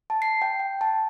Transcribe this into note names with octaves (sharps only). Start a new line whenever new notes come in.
A5
C7
G5
G5
A5